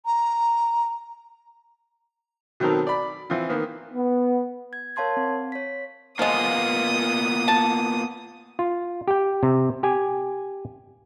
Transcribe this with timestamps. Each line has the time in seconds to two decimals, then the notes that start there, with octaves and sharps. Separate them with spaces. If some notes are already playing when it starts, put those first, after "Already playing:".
0.06 A#5
2.60 B2 D#3 F#3 C4 A4 A#4
2.87 D5 B5
3.30 E3 C4 F4
3.49 D#3 A#3 B3
3.94 B3
4.73 G#6
4.96 A#4 C#5 F5 A5 C6 G#6
5.17 C4 F5
5.52 C#5 B6
6.19 F3 G#3 A#3 B3 F4 D#6
7.48 A5
8.59 F4
9.08 G4 G5
9.43 C3
9.83 G4 G#5